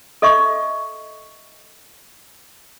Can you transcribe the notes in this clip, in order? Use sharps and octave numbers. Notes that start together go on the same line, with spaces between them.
A4 D#5 E5 C#6